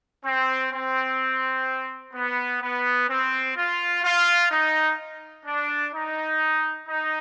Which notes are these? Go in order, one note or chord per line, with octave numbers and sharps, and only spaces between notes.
C4
C4
B3
B3
C4
F4
F4
D#4
D4
D#4
D#4